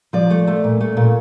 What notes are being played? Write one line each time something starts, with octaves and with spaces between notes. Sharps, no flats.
F3 D5
A3
A3
A#2
A3
A#2